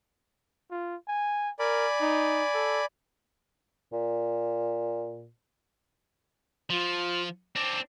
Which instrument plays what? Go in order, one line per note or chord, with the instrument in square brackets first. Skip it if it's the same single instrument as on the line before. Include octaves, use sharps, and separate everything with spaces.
[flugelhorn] F4
G#5
[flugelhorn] A#4 [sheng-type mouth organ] D5 G#5 B5
[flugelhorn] D#4
A4
[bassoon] A#2
[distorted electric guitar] F3 [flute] F4
[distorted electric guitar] C4 D4 [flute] D6